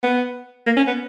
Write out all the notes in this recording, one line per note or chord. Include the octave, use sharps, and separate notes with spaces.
B3
A#3
C#4
B3